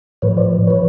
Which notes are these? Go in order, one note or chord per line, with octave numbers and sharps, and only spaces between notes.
A2 F3 B4 C#5
C5 D5
F3 B4 C#5